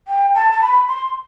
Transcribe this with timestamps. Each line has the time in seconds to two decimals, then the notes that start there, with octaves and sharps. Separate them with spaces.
0.08 G5
0.35 A5
0.52 A5
0.62 B5
0.88 C6